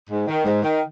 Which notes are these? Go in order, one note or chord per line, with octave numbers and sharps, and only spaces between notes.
G#2
D#3
G#2
D#3